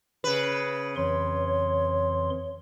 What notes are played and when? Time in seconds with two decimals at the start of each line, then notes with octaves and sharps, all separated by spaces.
0.24 C#3 B4
0.96 F2 E3 C#5 C6